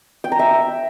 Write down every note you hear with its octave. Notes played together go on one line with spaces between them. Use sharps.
G5
A#5
E5